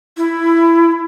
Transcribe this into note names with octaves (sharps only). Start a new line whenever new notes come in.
E4